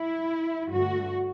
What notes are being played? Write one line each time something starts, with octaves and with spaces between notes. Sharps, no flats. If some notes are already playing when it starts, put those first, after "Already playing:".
Already playing: E4
G2 D3 A3 F#4